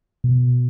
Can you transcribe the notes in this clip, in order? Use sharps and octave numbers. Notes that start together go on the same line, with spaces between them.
B2